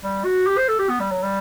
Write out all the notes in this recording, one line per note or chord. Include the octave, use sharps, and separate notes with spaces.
G3
F#4
G4
C5
A4
G4
B3
G3
F#3
G3